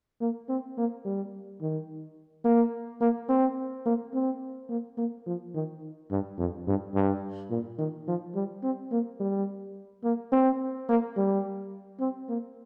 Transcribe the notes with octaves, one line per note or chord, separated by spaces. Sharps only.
A#3
C4
A#3
G3
D#3
A#3
A#3
C4
A#3
C4
A#3
A#3
F3
D#3
G2
F2
G2
G2
A#2
D#3
F3
G3
C4
A#3
G3
A#3
C4
A#3
G3
C4
A#3